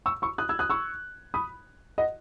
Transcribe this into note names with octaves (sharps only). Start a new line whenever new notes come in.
C#6 E6
C#6 E6
D#6 F#6
E6 G#6
D#6 F#6
C#6 E6
B5 D#6
D#5 F#5